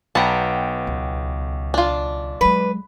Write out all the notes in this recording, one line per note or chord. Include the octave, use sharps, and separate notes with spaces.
B1 B3 G5 A5 A#5
C#2
D4 F4
F#3 G#3 B4